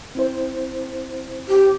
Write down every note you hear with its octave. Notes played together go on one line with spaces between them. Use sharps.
C4 E4 C5
G4